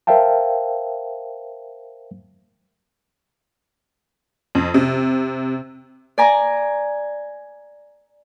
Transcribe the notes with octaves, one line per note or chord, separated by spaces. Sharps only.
A#4 C5 E5 F5 G5 A5
F2
C3
D5 G#5 A#5